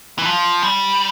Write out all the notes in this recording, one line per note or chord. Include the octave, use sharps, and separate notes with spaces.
E3
F3
G3